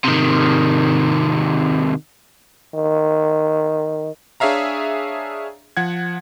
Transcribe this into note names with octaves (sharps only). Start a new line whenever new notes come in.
C3 D#3
D#3
D4 G#4 C#5 E5 F5 A#5
F3 F#5 G#6